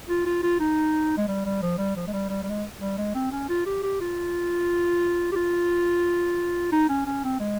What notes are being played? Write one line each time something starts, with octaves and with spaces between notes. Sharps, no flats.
F4
F4
F4
D#4
G#3
G3
G3
F3
G3
F3
G#3
G3
G3
G3
G#3
G3
G#3
C4
C#4
F4
G4
G4
F4
G4
F4
D#4
C#4
C#4
C4
G#3